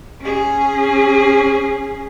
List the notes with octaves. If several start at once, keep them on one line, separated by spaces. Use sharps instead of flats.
C#4 G#4